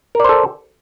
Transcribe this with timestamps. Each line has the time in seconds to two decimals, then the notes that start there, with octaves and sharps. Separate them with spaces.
0.15 A#4
0.20 D5
0.24 C5
0.29 A4